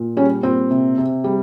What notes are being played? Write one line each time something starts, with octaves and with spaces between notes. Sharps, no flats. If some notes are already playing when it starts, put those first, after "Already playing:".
Already playing: A#2
G3 C#4
A#2 C4
C3
C3
G3